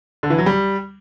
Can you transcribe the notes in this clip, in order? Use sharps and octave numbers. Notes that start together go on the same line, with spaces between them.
D3
E3
F#3
G3